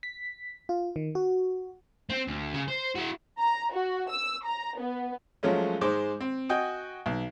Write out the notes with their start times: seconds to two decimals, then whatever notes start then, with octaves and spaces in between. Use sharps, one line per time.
0.03 B6
0.69 F4
0.96 D#3
1.15 F#4
2.10 C4
2.27 D2
2.53 C#3
2.68 C5
2.95 E4 F#4
3.40 A#5
3.73 F#4
4.10 E6
4.45 A#5
4.78 B3
5.43 F3 F#3 G#3 A3 C#4
5.81 G#2 G#3 C5 D6
6.20 C4
6.49 F#4 D#5 G5 G#5
7.06 B1